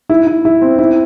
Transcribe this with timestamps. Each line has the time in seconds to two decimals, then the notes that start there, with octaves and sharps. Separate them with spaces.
0.09 E4
0.27 E4
0.45 E4
0.62 C4
0.79 E4